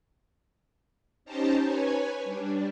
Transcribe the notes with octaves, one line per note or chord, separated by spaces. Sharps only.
C#4 D#4 G4 C5 A5 A#5
B4 C#5 G#5
G3 D4